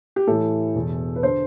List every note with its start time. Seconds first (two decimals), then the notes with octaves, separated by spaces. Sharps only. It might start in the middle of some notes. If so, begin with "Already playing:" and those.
0.16 G4
0.27 A2 E3 A4
0.76 E2 B2
1.16 B4
1.23 D3 C5